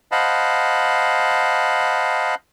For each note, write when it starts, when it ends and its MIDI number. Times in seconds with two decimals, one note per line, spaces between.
0.12 2.35 72
0.12 2.35 75
0.12 2.35 77
0.12 2.35 78
0.12 2.35 81
0.12 2.35 83